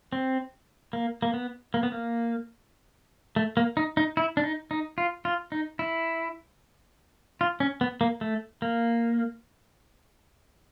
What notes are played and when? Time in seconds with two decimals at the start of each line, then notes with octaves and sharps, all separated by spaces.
0.12 C4
0.93 A#3
1.22 A#3
1.34 B3
1.74 A#3
1.83 B3
1.92 A#3
3.36 A3
3.57 A#3
3.77 D#4
3.97 D#4
4.17 E4
4.37 D4
4.44 D#4
4.71 D#4
4.98 F4
5.25 F4
5.52 D#4
5.79 E4
7.41 F4
7.60 C#4
7.81 B3
8.01 A#3
8.21 A3
8.62 A#3